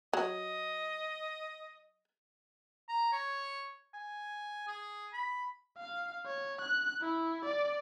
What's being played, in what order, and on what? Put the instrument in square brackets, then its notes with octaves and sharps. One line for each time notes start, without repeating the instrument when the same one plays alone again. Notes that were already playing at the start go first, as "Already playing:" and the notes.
[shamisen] F#3 [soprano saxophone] D#5
[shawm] A#5
C#5
G#5
G#4
B5
[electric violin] F5
C#5
F#6
E4
D5